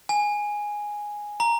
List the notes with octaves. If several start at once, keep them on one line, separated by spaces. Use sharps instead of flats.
G#5
A#5